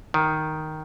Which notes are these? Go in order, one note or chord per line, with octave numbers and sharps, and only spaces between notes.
D#3